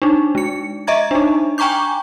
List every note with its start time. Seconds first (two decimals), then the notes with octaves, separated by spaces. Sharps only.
0.02 D4 D#4
0.35 G#3 C#7
0.87 D#5 E5 A#5 G#6
1.11 D4 D#4
1.58 G5 G#5 A#5 C#6 D6 G6